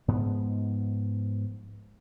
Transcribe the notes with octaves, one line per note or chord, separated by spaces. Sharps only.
G#2 F3 B3